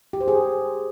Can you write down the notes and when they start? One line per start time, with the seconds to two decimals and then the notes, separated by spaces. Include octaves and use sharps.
0.13 G4
0.21 C5
0.28 G#4